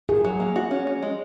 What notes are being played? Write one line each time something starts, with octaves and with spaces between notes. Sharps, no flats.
D#3 G#4
F#3
A#3
F#4
C#4
C#4
G#3